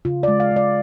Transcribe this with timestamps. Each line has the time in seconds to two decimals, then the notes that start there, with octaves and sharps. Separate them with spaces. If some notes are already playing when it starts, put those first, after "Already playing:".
0.05 C#3 F4
0.23 D5
0.28 G#3
0.40 F5
0.51 G#3
0.56 D5